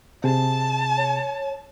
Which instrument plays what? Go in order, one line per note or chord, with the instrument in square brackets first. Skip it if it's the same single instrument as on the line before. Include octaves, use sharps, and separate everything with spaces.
[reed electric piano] C3 G#4 [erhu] A5
[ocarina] C#5